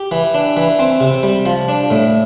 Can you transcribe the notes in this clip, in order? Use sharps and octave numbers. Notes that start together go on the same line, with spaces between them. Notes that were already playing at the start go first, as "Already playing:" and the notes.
Already playing: G4
E3
D4
E3
C4
C3
G3
F3
D4
A2